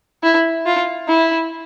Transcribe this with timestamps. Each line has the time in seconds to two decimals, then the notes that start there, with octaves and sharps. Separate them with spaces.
0.23 E4
0.66 F4
1.08 E4